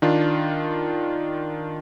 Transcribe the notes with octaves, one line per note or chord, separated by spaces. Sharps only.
D#3 D4 F4